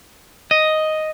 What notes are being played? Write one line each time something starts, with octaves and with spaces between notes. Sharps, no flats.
D#5